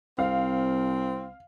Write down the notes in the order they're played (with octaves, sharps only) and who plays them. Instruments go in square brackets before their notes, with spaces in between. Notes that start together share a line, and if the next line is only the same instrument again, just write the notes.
[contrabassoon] C2 [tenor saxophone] C4 [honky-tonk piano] F5